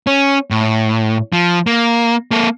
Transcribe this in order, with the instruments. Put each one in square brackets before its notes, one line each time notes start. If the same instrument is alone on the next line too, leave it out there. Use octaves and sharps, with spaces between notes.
[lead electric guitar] C#4
A2
F3
A#3
A#3 A4